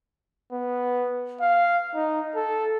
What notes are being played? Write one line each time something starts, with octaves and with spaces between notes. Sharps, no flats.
B3
F5
D#4
A4